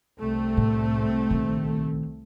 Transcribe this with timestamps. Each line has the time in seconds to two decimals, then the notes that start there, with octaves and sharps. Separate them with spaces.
0.19 C2 A3 C4
0.57 A2
1.30 A#1 D#3